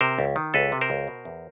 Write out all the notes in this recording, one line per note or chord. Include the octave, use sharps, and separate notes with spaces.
C3 A#4 C5
C#2
D#3
C#2 A4 B4
C3
A#4 C5
C#2
B2
E2